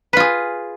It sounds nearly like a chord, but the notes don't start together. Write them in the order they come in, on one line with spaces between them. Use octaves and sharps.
B4 F4 G#4